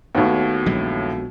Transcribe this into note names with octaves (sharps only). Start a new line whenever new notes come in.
D#2 A2 B3 F#4
A#1 F#3 G#3